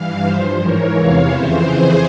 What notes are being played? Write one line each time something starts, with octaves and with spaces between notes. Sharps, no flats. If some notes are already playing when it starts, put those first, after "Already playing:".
Already playing: G2 E3 F5
G2 F3 C5 E5
G#2 E3 A#4 C#5
E2 C3 E3 C#5 F5
F2 C#3 E3 C5 E5
F2 E3 G#4 C5